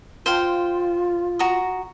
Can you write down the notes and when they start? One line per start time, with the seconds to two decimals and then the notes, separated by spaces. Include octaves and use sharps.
0.26 F4 C5 F5 G5
1.39 F#4 A#5 D#6